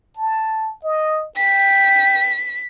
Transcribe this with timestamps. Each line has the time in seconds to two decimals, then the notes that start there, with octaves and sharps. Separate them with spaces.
0.17 A5
0.84 D#5
1.37 G5 B6